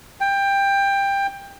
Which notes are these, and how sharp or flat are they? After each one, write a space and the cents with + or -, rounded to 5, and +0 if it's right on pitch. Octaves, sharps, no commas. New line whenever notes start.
G5 +15